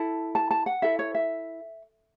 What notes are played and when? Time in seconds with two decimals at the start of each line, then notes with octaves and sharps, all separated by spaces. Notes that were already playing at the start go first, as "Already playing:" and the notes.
Already playing: E4 A4 A5
0.35 A5
0.51 A5
0.66 F#5
0.82 E4 A4 E5
0.99 C#5
1.15 E5